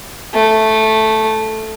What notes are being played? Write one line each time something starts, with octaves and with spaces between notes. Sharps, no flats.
A3